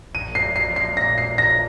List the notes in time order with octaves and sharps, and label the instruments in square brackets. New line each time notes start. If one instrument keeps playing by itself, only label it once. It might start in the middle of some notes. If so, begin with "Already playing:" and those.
[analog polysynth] A#1 [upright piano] D#7
[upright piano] C7
[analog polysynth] A#1
[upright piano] C7
[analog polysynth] F3
[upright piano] C7
[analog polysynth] A#2 [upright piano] A#6
[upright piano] C7
[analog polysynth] A#1
[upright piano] A#6